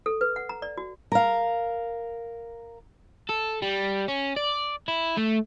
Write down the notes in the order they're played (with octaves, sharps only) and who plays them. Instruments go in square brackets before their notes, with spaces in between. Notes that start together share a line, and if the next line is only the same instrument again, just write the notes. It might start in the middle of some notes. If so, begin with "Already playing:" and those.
[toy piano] A4
B4
F#5
A#5
D5
F#4
[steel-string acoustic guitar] A#4 F5
[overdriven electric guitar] A4
G3
C#4
D5
E4
A3